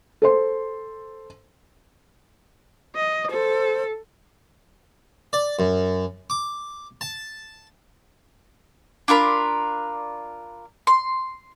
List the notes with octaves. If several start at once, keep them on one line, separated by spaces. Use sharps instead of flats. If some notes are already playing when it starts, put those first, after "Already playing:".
A4 C5 C6
D#5
A4 C5
D5
F#2
D6
A5
D4 F4 A#4 B5
C6